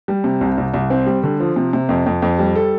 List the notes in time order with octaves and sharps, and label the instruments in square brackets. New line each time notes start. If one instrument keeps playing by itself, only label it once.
[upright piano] G3
C3
C2
C2
C2
C4
G3
D3
F3
C3
C3
F2
F2
F2
G3
A4